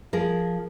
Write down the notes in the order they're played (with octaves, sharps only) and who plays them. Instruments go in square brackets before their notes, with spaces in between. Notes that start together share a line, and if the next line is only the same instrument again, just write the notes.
[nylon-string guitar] F3 G#4 A#4